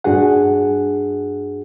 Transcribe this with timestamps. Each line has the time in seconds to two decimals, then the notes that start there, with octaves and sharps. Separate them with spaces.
0.04 G2 D4 F#4 G#4 F#5